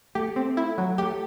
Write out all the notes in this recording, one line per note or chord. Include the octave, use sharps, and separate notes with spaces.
A3 G4
C4
E4
F#3
A3 G4